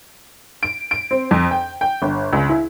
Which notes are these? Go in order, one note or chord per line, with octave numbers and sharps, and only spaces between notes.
D7
D7
C4
F2
G5
G5
G1
C#2
E4